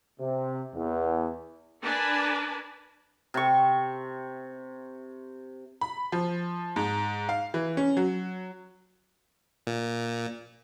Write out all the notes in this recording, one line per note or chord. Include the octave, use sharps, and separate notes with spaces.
C3
E2
D4 A#4 B4 D5 G#5 A5
C3 C#6
B5
F3
G#2
F5
E3
C#4
F#3
A#2